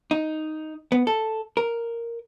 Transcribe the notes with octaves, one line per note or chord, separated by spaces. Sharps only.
D#4
B3
A4
A#4